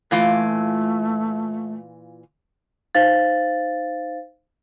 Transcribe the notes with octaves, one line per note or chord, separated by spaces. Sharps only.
A#2 E3 A3 F4
D#4 C5 F5 A6